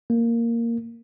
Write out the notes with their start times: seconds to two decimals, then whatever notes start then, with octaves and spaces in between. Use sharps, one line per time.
0.10 A#3